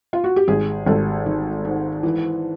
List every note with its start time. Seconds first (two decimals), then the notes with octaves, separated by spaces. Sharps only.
0.13 F4
0.24 F#4
0.36 G4
0.48 G#1 G#4
0.86 G#1 A4
1.26 D#3
1.65 G#2
2.03 E3